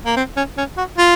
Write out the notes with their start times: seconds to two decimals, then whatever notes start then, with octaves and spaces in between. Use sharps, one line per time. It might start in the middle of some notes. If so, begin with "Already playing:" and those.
0.06 A#3
0.17 C4
0.37 C#4
0.57 C#4
0.78 F#4
0.98 F4